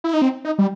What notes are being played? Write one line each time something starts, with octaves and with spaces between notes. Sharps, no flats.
E4
D#4
C4
D#4
G3